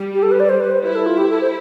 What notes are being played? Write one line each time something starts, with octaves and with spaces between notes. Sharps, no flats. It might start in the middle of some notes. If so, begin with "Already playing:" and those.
Already playing: G3
G4
A4
B4
D5
C5
B4
C5
E4 B4
A4
F4
G4
A4
C5